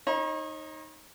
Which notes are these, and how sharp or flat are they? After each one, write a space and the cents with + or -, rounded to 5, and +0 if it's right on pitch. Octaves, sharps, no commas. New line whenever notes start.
D#4 +0 C#5 -40 A#5 +40